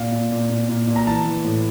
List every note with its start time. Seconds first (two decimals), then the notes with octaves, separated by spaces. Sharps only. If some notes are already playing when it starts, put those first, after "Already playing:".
Already playing: A#2 F5
0.12 A#2
0.32 A#2
0.50 A#2
0.69 A#2
0.87 A#2
0.96 A#5
1.07 E3 A5
1.25 E3
1.44 A2